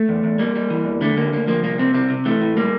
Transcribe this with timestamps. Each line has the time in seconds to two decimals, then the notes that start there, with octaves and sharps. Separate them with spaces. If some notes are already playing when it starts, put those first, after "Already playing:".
Already playing: A3
0.09 E2
0.24 E2
0.39 G3 A#3
0.55 G3
0.70 E3
0.86 E2
1.01 D3 A3
1.17 D2 A#3
1.33 D2 A#3
1.48 F3 A#3
1.64 C2 A#3
1.79 C3 C4
1.94 C2 C4
2.10 C3
2.25 E3 A3
2.41 A2
2.57 G3 A#3